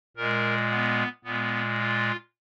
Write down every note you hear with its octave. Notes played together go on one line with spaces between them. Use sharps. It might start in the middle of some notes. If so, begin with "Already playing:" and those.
A#2 G#3 A#4
B3
A#2 G#3 B3
F4